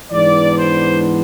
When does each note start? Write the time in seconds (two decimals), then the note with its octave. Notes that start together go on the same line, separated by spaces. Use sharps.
0.11 G#2 E3 B3 D4 D5
0.57 C5